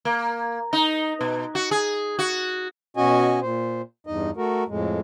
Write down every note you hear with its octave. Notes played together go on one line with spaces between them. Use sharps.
A#3
D#4
B2
F#4
G#4
F#4
B2 C#4 F#4 D#5 G#5
A#2 C5
E2 G2 D#4 D#5
A3 F#4 A#4
F2 A2 G#3